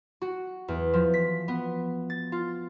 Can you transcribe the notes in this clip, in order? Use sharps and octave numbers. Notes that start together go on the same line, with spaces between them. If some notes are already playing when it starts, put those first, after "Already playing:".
F#4
E2
F3
B6
B3
A6
F4